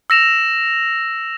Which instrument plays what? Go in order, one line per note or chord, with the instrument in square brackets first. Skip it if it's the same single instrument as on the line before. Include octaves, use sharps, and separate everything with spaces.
[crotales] E6 A#6 E7 F7